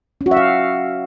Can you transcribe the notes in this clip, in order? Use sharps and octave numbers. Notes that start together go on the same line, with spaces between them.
C#4
F#4
E5
F5